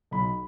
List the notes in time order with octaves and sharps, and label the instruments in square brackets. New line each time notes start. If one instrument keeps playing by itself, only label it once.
[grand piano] B1 B5